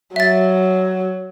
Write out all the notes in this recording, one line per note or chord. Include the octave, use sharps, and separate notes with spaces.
F#3 E5 A6